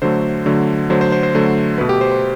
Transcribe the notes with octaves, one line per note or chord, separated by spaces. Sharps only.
D3 F#3 A3 C5
D3 F#3 A3
D3 F#3 A3 C5
C5
C5
C5
D3 F#3 A3
B2 A3 B4
G4
C5
C5